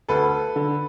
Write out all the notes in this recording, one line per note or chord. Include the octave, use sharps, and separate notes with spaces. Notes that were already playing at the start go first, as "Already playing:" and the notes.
D2 A4 B4
D3